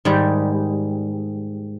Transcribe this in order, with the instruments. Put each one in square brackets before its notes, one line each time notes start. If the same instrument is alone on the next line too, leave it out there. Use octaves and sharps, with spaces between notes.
[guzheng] G#2 D#3 G3